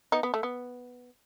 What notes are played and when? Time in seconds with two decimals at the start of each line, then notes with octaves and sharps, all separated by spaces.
0.12 B3 D#4
0.23 B3
0.34 A3
0.43 B3